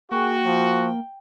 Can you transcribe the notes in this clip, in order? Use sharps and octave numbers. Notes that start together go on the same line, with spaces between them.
A#3 F#4 G#4 G5
F3